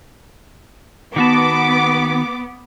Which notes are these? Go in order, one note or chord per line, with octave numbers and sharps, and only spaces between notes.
D#3 B3 F#4 A5 D6